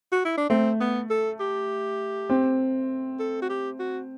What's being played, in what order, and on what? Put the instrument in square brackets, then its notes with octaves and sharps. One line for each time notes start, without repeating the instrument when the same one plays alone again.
[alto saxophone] F#4
E4
D4
[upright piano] A3 [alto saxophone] C4
[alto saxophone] B3
A4
G4
[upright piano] C4
[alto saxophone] A4
F#4
G4
F#4